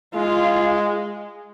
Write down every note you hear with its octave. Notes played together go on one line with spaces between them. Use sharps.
G#3 F4